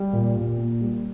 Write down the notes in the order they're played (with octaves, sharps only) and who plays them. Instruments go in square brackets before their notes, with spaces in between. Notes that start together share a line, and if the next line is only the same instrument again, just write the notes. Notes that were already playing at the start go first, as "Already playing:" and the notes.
Already playing: [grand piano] G3
A#2
A#2
A#3
G3